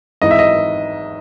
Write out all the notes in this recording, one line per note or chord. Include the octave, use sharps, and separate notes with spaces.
G#1 G#2 E3 D#5
E5
D#5